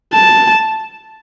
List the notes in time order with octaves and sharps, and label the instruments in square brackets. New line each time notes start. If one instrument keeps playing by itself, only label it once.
[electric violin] A5